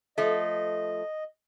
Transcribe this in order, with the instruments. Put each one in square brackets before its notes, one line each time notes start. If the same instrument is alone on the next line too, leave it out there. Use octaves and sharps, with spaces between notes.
[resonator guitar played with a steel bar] F3 A3 [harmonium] D#5